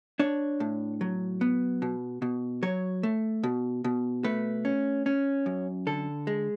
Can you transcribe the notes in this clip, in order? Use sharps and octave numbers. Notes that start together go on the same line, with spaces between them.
D4 C#5
A2
F#3
B3
B2
B2
F#3 C#5
A3
B2
B2
A3 B4
C#4
C#4
F#2
D3 A4
G#3